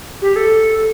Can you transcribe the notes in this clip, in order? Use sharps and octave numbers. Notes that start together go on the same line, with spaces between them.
G4
A4